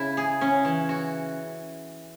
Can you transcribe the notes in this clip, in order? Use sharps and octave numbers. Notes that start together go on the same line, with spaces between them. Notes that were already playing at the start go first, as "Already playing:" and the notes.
Already playing: C#3 E4
G#4
C#4
E3
F#4